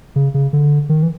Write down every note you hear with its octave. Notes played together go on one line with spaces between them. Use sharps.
C#3
C#3
D3
D#3
E3